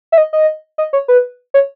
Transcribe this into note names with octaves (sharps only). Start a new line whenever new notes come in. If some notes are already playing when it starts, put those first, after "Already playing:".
E5
D#5
D#5
D#5
C#5
B4
C#5